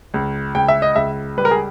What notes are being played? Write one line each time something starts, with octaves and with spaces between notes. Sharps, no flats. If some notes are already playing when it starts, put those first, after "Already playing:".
C#2
C#2 G5
E5
D#5
C#2 E5
G3 B4
A#4
G#4